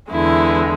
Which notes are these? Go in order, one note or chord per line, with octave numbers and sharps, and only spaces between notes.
E2 D3 G#3 E4